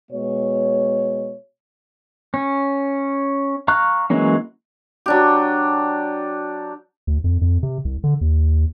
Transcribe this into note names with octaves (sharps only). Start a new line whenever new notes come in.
B2 G#3 C#5
C#4
F5 A#5 C#6 F6 F#6
E3 F#3 G#3 A#3 C#4
F#3 D4 G4
D2
F2
F2
C3
C2
D3
D#2